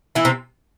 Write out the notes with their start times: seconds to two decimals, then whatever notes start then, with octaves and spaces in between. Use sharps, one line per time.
0.15 E3 E4
0.25 C3 C4